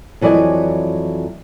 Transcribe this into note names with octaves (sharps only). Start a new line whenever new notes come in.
F2 E3 F#3 D5 D#5 G#5